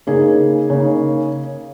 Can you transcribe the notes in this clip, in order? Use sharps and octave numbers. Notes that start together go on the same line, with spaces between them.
C#3 A#3 D#4 G#4 C#5
C#3 A#3 D#4